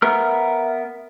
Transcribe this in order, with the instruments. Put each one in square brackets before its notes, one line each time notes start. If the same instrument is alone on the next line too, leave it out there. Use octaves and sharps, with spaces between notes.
[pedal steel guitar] B3 A#4 F6 [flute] E5